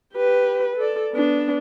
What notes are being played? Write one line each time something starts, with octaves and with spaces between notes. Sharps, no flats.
G4 B4
A4 D5
B3 D4